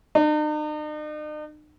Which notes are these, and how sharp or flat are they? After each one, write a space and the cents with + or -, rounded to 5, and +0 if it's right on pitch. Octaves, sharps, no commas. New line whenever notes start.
D#4 -45